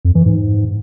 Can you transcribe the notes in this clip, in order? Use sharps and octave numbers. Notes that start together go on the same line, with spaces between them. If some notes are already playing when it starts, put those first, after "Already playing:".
F2
E3
G#2